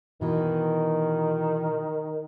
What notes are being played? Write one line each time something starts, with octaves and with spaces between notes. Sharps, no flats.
B2 D#3 E3